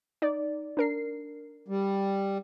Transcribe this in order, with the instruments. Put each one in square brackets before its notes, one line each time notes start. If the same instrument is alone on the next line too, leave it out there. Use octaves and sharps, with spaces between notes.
[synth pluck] D#4 D5
D4 A#4 C7
[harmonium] G3